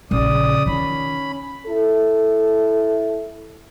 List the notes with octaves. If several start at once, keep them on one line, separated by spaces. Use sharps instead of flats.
A#1 C#3 C#4 D5 D#6
D#3 C#4 F4 B5
E4 A4